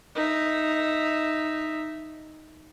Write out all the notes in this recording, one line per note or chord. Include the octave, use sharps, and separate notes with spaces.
D#4 E5